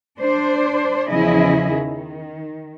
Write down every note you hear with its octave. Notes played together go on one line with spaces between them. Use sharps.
D4 C5
E2 C#3 F3 E4 G#4 D#5
D#3